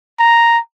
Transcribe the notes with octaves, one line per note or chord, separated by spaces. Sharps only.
A#5